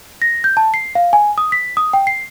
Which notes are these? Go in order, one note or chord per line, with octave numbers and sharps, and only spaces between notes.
A#6
G6
A5
C7
F5
G#5
D#6
B6
D#6
G5
C7